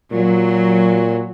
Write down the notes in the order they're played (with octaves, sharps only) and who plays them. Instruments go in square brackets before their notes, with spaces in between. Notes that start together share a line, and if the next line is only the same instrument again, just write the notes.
[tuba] A#2 [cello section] F#3